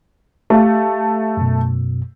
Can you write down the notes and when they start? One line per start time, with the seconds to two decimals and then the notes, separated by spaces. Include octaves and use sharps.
0.50 A3 G4 F5
1.37 F#2 B2